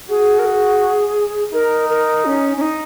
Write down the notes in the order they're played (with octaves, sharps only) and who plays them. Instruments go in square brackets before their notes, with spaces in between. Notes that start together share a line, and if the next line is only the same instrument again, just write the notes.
[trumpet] F#4 [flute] G#4
[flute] A#4
G#4
[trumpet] D#4 [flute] A#4
[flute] A#4
C#4
C#4
D#4